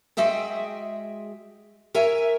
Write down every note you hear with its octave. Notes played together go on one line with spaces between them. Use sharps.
G#3 F#4 G#4 E5 G5
A#4 C#5 E5 G#5